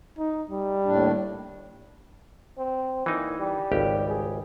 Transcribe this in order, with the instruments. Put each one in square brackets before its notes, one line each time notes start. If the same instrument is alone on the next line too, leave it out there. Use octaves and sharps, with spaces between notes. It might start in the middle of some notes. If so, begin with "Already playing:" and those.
[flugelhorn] D#4
G3
[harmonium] D#2 A2 D4
[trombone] C4
[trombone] A#2 [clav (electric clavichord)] E3 D#4
[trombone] G3
[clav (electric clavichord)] G#1 C#2 G4
[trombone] G#4